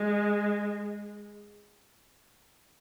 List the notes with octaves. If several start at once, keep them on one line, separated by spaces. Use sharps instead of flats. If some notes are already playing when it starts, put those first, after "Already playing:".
Already playing: G#3